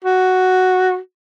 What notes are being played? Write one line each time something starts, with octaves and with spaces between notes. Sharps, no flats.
F#4